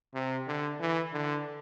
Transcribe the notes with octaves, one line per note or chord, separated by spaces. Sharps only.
C3
D3
E3
D3